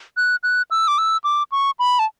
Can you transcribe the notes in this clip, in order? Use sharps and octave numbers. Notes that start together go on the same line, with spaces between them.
F#6
F#6
E6
D6
E6
D6
C#6
B5
A5